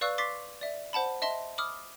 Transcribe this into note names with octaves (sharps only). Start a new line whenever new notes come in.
B4 D5 F5 C#6 E6 F#6
C6 D6 A6 B6 C7
D5 E5
C5 F#5 A5 B5
D#5 E5 A5 C6
B5 D6 D#6 F6